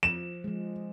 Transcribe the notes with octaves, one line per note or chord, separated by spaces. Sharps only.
F3 E7
F3 G#3